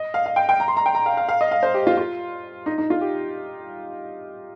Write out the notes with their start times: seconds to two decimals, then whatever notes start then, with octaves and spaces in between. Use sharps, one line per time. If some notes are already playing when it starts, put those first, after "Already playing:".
Already playing: D#5
0.14 F5
0.26 F5
0.36 G5
0.49 G5
0.60 A#5
0.68 C6
0.77 A#5
0.86 G5
0.95 A#5
1.06 F5
1.17 F5
1.29 F5
1.41 D#5
1.51 F5
1.63 C5
1.74 G4
1.87 F4
1.97 F4
2.66 D#4
2.78 D#4
2.90 F4
3.01 G4